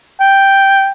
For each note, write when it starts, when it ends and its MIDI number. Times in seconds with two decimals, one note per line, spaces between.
0.21 0.92 79